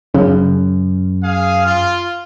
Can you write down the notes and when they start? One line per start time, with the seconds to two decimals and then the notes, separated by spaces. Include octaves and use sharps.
0.14 F#2 C#3
1.21 G#4 F5
1.65 F4